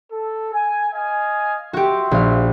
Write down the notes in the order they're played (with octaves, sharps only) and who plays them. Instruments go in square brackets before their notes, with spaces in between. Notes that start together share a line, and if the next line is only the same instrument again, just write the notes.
[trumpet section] A4
G#5
D#5 F5 G#5
[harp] F#4 G4 [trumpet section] E5 C6
[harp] A#1 F5